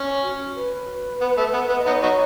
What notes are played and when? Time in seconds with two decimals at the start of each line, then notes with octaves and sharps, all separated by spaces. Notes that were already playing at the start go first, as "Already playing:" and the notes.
Already playing: C#4
0.23 F#4
0.55 B4
1.21 B3
1.38 A3
1.54 B3
1.69 B3
1.78 D#5
1.86 B3 D#4 C#5
2.03 D#4 F#4